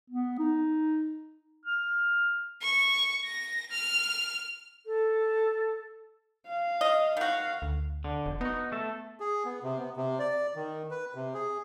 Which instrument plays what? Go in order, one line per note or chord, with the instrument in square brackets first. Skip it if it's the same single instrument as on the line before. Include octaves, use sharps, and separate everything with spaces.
[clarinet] B3
D#4
F6
[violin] C#6
A#6
F6
[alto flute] A4
[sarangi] F5
[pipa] D#5
[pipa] D#3 F#4 [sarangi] F5
[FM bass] D2
[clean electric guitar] D3
[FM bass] E1
[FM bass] B3 [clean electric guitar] D#4 F#4
[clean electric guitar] A3 A4
[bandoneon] G#4
B3
C3
B3
C3
D5
D#3
B4
C3
G#4